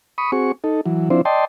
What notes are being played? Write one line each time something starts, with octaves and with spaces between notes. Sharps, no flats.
B5 C#6 D#6
C4 F#4 G#4 C#6
D#4 A4
E3 F#3
F3 C4 D4 E4 C5
D5 D#5 G5 A5 C6